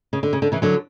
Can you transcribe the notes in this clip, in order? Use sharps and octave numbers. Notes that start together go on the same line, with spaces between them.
C#3
D3
C#3
D3
C#3 E3
D3 F#3